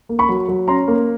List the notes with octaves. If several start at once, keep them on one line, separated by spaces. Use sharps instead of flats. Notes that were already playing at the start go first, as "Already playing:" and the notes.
A#3
B5 C#6
F#3
F#3
C#4 A#5 C6
A#3